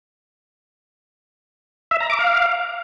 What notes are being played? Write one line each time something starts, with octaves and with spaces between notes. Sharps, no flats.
E5
A#5
D6
F5